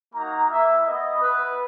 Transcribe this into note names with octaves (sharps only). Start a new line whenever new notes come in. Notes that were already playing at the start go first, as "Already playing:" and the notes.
A#3 D#4 F#4 A#5
A#3 E4 E5
B3 E4 D#5
B3 E4 B4